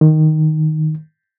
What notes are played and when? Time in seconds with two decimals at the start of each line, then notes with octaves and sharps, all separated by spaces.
0.01 D#3